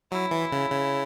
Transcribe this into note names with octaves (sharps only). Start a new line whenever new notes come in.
F#3 E4
E3
C#3
C#3